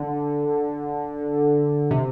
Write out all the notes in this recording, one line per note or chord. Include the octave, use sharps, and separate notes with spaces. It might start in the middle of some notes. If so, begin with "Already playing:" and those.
Already playing: D3
C3